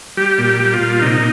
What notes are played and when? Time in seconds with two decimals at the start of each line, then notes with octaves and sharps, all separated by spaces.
0.17 G3 G4
0.38 A#2
0.44 G4
0.60 G3
0.74 F4
0.80 A#2
1.01 C3 D#4